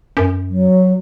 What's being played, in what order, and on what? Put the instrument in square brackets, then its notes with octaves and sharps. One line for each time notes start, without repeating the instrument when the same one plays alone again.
[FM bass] F#2
[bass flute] F#3